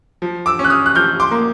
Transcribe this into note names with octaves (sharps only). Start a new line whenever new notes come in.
F3
D6 E6
C#4
F#6
D#6 F6
F#6
F3 F6 G6
C6 D6
A#3